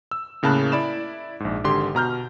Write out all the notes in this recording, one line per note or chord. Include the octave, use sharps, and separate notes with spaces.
E6
A2 C#3 A#3 A5 B5 F#6
E4 D5 B5 E7
A#1 G#2
G#1 D3 G4 C6
B2 A#5 F6 G6